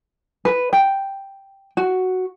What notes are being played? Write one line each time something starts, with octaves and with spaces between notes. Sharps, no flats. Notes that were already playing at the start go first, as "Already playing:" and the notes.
B4
G5
F#4